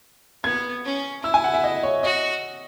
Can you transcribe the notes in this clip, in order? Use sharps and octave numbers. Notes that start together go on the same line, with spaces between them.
B3 G#6
C#4
E4 E6
G#5
F#5
E5
D#5
C#5
F#4 D#5